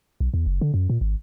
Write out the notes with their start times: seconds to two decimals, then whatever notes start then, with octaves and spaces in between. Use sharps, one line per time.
0.20 B1
0.34 E2
0.46 F#1
0.61 D3
0.74 F#2
0.90 A#2
1.01 G#1